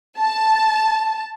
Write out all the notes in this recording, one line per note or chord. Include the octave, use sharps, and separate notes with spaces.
A5